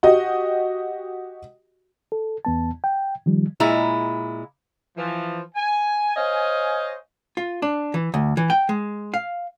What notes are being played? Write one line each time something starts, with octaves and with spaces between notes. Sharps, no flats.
F#4 G4 D#5
A4
E2 B3 A5
G5
D#3 F3 G3
A#2 G#3 E4 A#5
E3 F3
G#5
C5 C#5 D#5 F5 G#5
F4
D4
E3
D2
E3
G5
G#3
F5